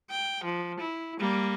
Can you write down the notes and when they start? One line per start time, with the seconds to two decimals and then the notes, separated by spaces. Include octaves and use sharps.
0.11 G5
0.44 F3
0.80 E4
1.19 G3 A#3